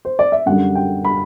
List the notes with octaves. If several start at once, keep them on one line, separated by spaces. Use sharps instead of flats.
C5
D5
E5
F#2 D3 G3 F#5
G5
B5